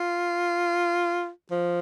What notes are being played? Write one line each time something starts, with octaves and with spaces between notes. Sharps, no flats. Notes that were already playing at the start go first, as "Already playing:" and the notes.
Already playing: F4
F3